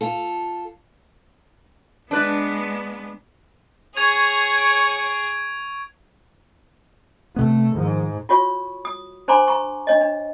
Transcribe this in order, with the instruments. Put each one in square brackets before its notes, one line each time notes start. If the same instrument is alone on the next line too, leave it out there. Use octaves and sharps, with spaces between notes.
[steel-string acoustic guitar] F4 A4
[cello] G#3 B3 [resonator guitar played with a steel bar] D4 B4 D5
[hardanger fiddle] G#4 [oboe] C#5 [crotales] C#6 G#6 F7
[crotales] D7
[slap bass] C3 B3 [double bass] A3
[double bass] G#2 [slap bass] D#3 F3
[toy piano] F4 F#4 C#5 C#6
D#6
D4 C5 G#5 A#5 C6 D6
A#5 C#6
D4 C#5 D#5
D4